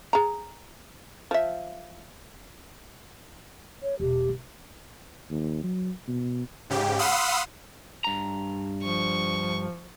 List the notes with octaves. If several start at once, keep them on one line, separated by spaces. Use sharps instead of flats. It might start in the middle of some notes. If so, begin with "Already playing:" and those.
G#4 A#5
F3 E5
C#5
E1 B2 G4
D4
D#2
F#3
B2
G#2 C#3 G4
F5 F#5 B5 C6 D#6 E6
G2 A#5
F3 C#6